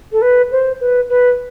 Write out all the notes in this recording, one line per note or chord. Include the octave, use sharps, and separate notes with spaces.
A4
B4
C5
B4
B4